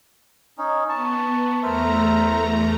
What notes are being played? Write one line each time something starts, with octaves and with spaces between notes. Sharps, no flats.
C#4 D#4
B3 A5 C#6
E2 A3 A#4 C5 E5 A#5